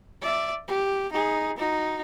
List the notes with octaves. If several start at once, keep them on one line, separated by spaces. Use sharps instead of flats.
D5 E5
G4
D#4 G#4
D#4 F#4